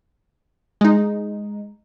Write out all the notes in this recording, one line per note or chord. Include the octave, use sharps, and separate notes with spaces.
G#3 D#4